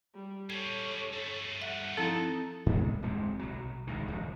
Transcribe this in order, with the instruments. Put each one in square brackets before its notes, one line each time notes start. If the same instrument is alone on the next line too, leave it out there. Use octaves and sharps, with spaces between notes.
[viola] G3
[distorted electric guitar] G3 C#4 [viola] A4 C#5 [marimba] G#6
[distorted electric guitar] G2 A3
[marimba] E5 [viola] F#5
[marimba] F3 C4 E4 [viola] D#4 [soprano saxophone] A4
[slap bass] G2 A#2 G#3 B3
D1 E2 G#3 C4
B1 F#3
G#1 C#2 A2 D#3
D#1 D2 F3 F#3